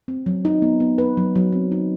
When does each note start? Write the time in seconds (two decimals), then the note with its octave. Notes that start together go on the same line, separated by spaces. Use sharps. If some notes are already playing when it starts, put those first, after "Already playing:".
0.08 C4
0.26 F#3
0.45 D#4
0.62 B3
0.80 B3
0.98 B4
1.17 F#3
1.35 F#3
1.52 C4
1.72 D#4